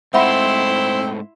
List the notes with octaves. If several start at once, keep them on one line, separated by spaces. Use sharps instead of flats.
G#2 A3 C4 E4 E5 F#5 B5 C6